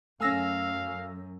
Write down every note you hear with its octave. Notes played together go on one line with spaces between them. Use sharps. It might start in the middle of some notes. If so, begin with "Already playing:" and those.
F#2 A3 C#4 F5 G#5 E6 A#6